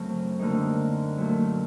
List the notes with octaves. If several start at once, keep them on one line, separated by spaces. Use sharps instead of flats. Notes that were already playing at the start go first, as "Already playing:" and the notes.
Already playing: F#2 C#3 F#3 A3 C4
F#2 D3 G3 A#3 D#4
A#2 F#3 A3